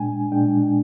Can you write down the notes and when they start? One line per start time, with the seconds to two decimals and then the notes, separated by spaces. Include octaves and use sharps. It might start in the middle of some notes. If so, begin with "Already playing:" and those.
Already playing: A#2 G#3 D4 G5 G#5
0.32 A#2 G#3 D4 G5